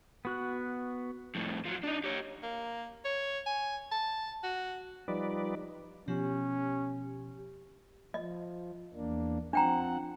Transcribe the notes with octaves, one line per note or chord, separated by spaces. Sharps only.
B3 F#4 F#6
F2 A2
F3 F#3
D4 D#4
G4 C#5
A#3
C#5
G#5
A5
F#4
F3 G3 D#4 B4 D5
B2 F3 C#4 G4
F3 D#5
E2 A#3 D4
F3 C4 D4 F#5 G5 A#5